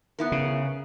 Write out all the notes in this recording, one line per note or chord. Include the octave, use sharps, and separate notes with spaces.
B3 E4 A#4
C#3